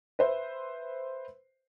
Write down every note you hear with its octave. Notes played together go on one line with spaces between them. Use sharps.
B4 C5 E5